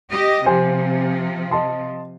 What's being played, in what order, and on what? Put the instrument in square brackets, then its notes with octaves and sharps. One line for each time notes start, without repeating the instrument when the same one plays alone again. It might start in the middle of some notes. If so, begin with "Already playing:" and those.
[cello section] G4 D#5
[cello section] C3 F3 [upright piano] G4 C5 G#5
[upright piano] D#5 A5 C6